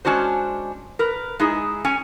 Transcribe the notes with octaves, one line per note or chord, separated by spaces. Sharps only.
G#3 C#4 D4 F#4 C5
A#4 B4
G#3 D#4 E4 G#4
C#4 G#5